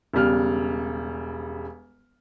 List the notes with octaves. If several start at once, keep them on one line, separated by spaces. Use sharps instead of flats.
E1 C#3 G3 F6